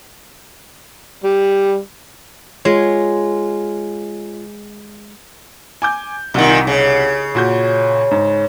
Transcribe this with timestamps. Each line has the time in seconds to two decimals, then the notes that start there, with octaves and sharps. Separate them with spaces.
1.24 G3
2.65 G#3 F4 C#5
5.82 G#5 D6 G6
6.34 C2 A#2 D#3 F#5
6.67 C#3
7.35 A#2 F#4 G6
8.11 G#2